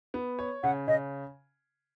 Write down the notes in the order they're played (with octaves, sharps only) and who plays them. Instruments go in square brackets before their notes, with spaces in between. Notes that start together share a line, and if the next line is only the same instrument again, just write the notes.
[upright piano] B3
C#5
[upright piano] C#3 [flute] F#5
[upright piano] C#3 [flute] D#5